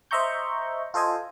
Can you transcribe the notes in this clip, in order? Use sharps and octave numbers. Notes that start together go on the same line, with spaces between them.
C5 D#5 E5 A#5 C#6 G6
F4 A4 C5 D#5 G#5